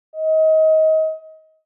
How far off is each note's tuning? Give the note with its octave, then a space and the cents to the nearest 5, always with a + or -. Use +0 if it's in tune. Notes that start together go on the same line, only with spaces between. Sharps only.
D#5 +25